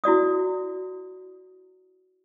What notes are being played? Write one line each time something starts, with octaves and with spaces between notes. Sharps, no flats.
E4 F#4 D5 D#6